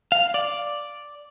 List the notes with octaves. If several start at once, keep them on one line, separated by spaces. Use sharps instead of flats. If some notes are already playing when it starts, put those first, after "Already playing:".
F5
D5